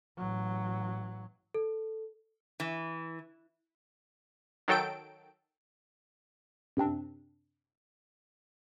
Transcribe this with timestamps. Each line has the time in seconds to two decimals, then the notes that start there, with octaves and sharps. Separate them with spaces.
0.18 A1 F#3
1.54 A4
2.60 E3
4.68 D#3 F#3 A4 G5 D7
6.77 F#2 C3 C4 D4